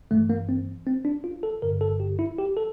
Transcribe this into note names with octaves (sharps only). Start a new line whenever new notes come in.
G1 G2 E3 A3
A#3
C4
C4
D4
F4
A4
G1 G2 D3 A#4
A4
G4
E4
G4
A4